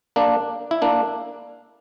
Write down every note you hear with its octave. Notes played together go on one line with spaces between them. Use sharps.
A#3 D4
E4
A#3 D4